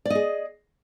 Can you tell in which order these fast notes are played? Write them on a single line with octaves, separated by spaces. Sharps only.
D5 D#5 G#4